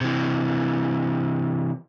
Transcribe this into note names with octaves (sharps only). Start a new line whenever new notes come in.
C3 E3